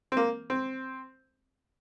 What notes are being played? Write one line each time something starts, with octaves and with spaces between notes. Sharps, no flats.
C4
A#3
C4